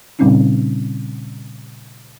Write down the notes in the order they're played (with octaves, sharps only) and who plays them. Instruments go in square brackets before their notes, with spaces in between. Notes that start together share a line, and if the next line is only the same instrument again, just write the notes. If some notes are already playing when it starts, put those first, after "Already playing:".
[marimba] A#2 C#3 G3 C4 C#4 D#4